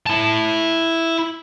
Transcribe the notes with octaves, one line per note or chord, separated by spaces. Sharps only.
E4 A5